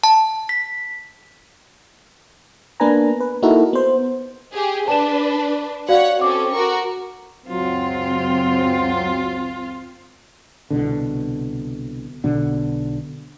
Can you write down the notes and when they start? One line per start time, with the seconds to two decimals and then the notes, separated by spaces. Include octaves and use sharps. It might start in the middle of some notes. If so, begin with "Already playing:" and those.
0.04 A5
0.49 B6
2.80 A#3 B3 D4 B4 G#5 A#5
3.21 B4
3.42 A#3 D#4 E4 F#4 A4 A#4
3.73 B3 C5
4.53 G4 G#4
4.88 D4 B4 A5 E7
5.89 F#4 C#5 D5 F5 F#5
6.21 C4 C#4 A4 D6
6.52 F#4 A#4 C#6
7.48 C#2 F#2 F#3 C4 F4
10.70 C2 B2 D3
12.24 B1 B2 D3 B3